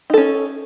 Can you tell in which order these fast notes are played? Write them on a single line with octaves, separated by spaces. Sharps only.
D#4 A4 C#4